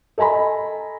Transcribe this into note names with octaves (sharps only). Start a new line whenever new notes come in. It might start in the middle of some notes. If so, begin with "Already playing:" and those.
A4 D#5 G#5 A#5 B5